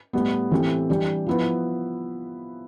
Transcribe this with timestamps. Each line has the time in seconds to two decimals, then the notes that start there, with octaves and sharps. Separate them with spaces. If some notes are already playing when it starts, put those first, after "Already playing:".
0.13 A2 G3 B3
0.51 A2 E3 A3 C4 G4
0.90 E3 G3 D4 G4
1.26 F3 B3 E4 B4